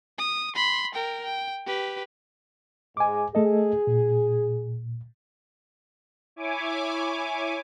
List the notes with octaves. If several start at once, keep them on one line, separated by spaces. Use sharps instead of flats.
D#6
B5 C6
A#4 G5
G5
G4 B4
G#2 G#3 G#5 D6
A3 G#4 A4 D#5
A#2
E4 C#5 G#5 D6